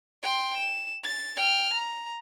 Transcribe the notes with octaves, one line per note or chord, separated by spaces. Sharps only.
G5 C6
E7
A6
G5 F6
A#5